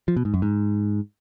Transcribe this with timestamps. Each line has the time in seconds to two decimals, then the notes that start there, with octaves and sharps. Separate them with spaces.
0.08 F3
0.16 B2
0.25 G#2
0.34 F#2
0.42 G#2